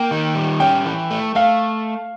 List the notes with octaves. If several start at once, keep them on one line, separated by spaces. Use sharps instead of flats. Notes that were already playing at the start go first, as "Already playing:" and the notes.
Already playing: A#3 G5
D#3
G3
C#4 G5
E3
A3
A3 F5